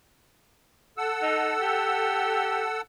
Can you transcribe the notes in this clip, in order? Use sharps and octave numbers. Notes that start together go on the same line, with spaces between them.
A4 F#5 E6
D#4
G4